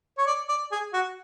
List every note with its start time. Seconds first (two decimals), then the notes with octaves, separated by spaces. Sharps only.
0.18 C#5
0.26 D5
0.49 D5
0.71 G#4
0.93 F#4